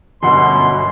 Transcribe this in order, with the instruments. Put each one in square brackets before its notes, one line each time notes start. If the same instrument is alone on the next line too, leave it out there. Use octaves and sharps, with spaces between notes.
[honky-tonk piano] G1 F#2 F#5 [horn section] B2 [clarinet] C6